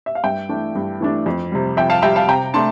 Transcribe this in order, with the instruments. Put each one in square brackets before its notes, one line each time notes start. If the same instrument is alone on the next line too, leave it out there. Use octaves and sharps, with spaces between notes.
[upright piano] E5
F5
G2 E5 G5
E3 A3 D4
G2
E3 A3 D4
F2
C3 G3
F2 E5 G5
F5 A5
C3 G3 E5 G5
F5 A5
C3 G5 A#5
A3 D4 A5 C6